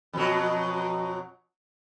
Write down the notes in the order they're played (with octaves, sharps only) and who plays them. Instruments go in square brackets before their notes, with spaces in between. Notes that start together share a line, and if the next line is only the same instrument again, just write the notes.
[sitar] F2 B2 F#3